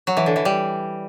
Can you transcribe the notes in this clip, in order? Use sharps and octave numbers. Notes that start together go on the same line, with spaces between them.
F#3
E3
D3
E3
G3